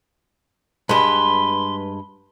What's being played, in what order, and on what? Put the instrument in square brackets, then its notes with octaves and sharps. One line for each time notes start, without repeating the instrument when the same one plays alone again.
[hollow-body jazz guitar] G2 G#3 [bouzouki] B4 [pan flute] C6